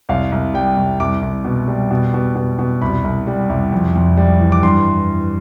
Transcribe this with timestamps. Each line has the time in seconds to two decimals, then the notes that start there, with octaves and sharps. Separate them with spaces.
0.09 C2 F5
0.32 C2
0.54 G3 G5
0.76 C2
1.00 C2 D6
1.22 C2
1.45 B2
1.68 G3
1.91 B2
2.14 B2
2.35 B2
2.59 B2
2.82 C2 B5
3.04 C2
3.27 G3
3.50 C2
3.72 F2
3.95 F2
4.17 G3
4.40 E3
4.52 D6
4.63 G2 C6